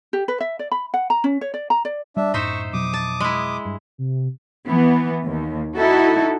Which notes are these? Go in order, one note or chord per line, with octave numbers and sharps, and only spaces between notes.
G4
B4
E5
D5
B5
F#5
A#5
C#4
C#5
D5
A#5
D5
G3 D4 E5
F#2 A2 D#4 C5 E5 C#6
F2 B2 F#3 D6 D#6
A5
G#3 E4
G2
C3
E3 B3
D#2
D#4 E4 F#4 A4